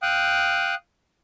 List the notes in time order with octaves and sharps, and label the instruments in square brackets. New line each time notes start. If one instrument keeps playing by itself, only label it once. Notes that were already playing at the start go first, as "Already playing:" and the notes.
[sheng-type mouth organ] F5 G5 D#6 F#6